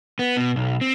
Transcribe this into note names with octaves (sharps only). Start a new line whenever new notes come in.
B3
B2
B1
C4